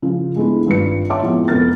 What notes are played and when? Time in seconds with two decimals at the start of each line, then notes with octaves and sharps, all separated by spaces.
0.02 C#3 F3
0.36 G#3 A3 B3 D4 E4
0.67 G#1 G2 G3 F4 B4 C#7
1.10 C#5 E5 F#5 A5 C6 D6
1.22 A2 F3 G#3 B3 C4
1.48 F1 B3 C#4 A#4 F6 A6